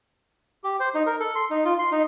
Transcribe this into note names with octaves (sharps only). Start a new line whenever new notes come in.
G4
C5
D#4
A#4
A4
C6
D#4
F4
C6
D#4